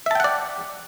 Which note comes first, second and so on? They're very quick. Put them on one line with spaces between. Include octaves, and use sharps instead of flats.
E5 A5 G5 F#5 D5